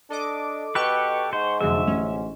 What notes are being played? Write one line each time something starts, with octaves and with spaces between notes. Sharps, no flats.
D4 A4 D#5 D6
B2 G4 A4 B4 C#6
G#2 C5
F1 D3 F3 F#3 G#4 E5
A1 C#4